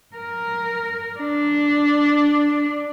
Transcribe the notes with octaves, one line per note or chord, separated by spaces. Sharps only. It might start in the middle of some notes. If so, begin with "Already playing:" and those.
A#4
D4